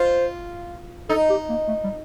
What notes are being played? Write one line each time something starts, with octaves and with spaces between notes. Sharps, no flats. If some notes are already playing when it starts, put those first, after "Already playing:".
Already playing: F4 C5
D#4 A4
G4
A#3
A3
G3